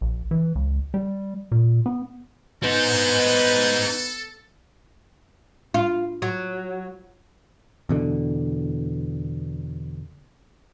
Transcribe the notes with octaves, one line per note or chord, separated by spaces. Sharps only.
A#1
E3
C#2
G3
A#2
B3
B3 D#4 A4 C5
F4
F#3
E2 B2 D3